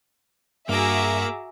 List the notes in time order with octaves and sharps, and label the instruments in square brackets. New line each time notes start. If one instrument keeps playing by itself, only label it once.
[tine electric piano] G2 [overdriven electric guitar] A#3 [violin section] F#4 G#4 E5 [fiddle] A#5 D6